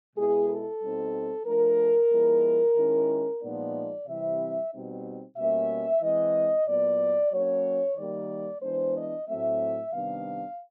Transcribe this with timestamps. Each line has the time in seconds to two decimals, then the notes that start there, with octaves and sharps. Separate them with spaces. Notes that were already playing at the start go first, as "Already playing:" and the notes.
0.16 B2 G#3 B3 E4 G#4
0.48 A4
0.82 B2 G3 C4 D#4
1.46 F3 A3 D4 A#4
2.12 F3 G#3 B3 E4
2.76 D#3 G#3 C#4 E4
3.42 A#2 F3 G#3 B3 D#4 D5
4.07 C3 E3 G3 C4 E4 E5
4.72 B2 G3 C4 D#4
5.36 B2 G3 A#3 C#4 E5
6.02 E3 G#3 C4 D#5
6.67 A#2 F#3 B3 D5
7.33 F#3 A#3 C#4 C#5
7.97 D#3 G3 A#3 D5
8.62 E3 G#3 B3 D4 C5
8.96 D#5
9.28 A2 F#3 A3 C4 E5
9.92 C3 D#3 G3 B3 D4 F5